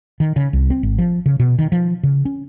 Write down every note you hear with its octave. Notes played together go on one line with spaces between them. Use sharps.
D#3
C#3
C2
C4
G#1
F3
C#3
B2
D#3
F3
C#3
C#4